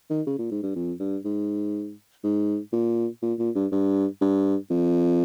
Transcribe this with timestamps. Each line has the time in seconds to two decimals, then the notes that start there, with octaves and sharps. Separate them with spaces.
0.10 D#3
0.27 C#3
0.38 A#2
0.51 G#2
0.63 G2
0.76 F2
1.00 G2
1.25 G#2
2.24 G#2
2.73 A#2
3.22 A#2
3.39 A#2
3.55 G2
3.72 G2
4.21 G2
4.71 F2